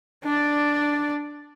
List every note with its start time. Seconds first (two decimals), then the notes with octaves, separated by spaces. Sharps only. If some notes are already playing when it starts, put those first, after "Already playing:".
0.24 D4 D5